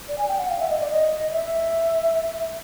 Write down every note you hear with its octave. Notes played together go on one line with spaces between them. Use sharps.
D5
G#5
G5
F#5
F5
E5
D#5
D5
D#5
E5